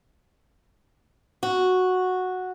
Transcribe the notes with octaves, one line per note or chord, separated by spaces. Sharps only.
F#4